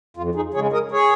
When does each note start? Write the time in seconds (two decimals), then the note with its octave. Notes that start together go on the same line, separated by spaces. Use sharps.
0.17 F2 F4
0.35 D#4 G#4
0.54 C#3 G#3 G#4 C#5
0.73 A#4 D#5
0.91 G#4 C#5